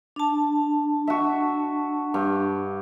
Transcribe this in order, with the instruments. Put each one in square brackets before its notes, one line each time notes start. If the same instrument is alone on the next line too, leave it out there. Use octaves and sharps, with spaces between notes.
[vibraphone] D4 A5
[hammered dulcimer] F#4 E5
G2